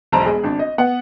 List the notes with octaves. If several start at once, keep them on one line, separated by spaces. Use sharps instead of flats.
E1 B1 C5 A5 A#5
G#3 G#4
G#1 D4
D#5
B3 F#5